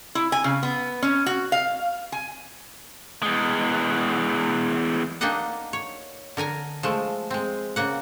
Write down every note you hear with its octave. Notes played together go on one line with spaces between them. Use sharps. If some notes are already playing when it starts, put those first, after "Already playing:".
E4
G#5
C#3
B3
C#4
F#4
F5
G#5
E2 G#3
A#3 D4 D#4 G4 D#5 F#5
C#5
D3 A#4 G#5 A#5
F3 G#3 A3
G#3 C4
C#3 A#3 F#5